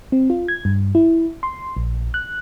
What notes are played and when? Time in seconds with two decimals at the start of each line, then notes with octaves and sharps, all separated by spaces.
0.12 C4
0.30 F4
0.48 G#6
0.65 G2
0.95 E4
1.43 C6
1.77 A#1
2.14 F#6